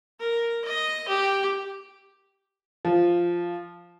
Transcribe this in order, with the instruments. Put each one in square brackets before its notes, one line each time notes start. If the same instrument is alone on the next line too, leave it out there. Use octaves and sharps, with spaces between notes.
[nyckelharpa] A#4
D#5
G4
[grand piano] F3